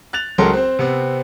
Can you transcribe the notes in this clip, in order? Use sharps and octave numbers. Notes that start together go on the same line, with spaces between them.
F#6 A6 F7
C#2 F#3 G#3 A4 A#4 C6
C4 C5
C3 B3 C4